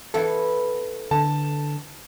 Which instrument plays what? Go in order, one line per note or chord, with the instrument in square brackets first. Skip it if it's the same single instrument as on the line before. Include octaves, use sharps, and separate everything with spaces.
[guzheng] E3 B3 E5 [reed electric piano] A4
[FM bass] D3 [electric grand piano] A5